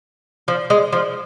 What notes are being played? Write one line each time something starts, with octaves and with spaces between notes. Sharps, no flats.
F3
G#3
F3